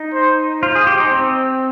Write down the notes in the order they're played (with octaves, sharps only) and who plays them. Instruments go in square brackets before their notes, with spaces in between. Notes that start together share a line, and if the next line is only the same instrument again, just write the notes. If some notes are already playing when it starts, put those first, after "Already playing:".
Already playing: [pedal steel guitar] D#4
[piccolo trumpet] C5
[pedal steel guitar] F4 [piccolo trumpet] C5
[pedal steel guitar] G#4
G4
D#4
C4